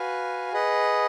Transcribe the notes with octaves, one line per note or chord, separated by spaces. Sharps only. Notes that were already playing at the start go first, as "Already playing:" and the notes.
Already playing: F#4 B4 F5 G#5
G#4 B4 D#5 F#5